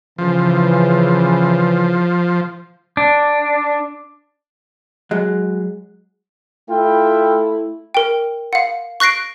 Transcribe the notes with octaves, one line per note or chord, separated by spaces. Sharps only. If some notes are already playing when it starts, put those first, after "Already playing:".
C#3 E3 F3
D4
F#3 G#3
A3 E4 F4 E5 G5
A#4 G5
F5 F#5
C#6 F#6 A#6 C7 D7